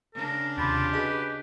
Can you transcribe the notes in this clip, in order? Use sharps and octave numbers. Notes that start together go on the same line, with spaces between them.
C#3 D4 A#4
D#2 C3 F4 G4 B5
F#4 G#4 B4 D#5